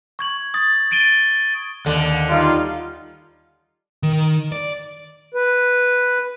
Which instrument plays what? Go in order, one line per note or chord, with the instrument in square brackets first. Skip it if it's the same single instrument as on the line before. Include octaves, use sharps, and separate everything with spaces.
[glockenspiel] C#6 G#6 F#7
D#6 A6
A6 D7 D#7 G7
[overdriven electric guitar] D#2 [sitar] D3
[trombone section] G3 D#4 F4
[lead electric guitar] D#3
D5
[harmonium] B4